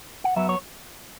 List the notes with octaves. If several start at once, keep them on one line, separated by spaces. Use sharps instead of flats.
F#5
F#2 F#3 B3 E5
C#5